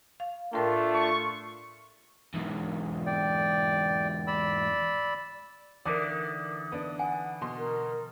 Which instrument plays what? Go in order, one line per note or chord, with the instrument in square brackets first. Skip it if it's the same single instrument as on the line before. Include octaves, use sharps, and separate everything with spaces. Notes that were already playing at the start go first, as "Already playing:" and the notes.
[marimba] F5
[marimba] A2 A#4 G5 [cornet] A3 [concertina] D4 F4
[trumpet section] C#6
[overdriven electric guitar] E2 G#2
[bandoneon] D5 G5
D5 B5 E6
[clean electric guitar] D3 E3 D#4 [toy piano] A#4 A#5 [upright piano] D5 D6 [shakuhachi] D#6
[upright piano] B3 D4
[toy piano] F#5 G#5
[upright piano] B2 C6
[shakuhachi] A#4